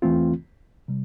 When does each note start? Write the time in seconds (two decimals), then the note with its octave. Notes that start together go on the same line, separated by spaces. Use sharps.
0.02 E2 E3 A3 C4 F4
0.88 C3 G3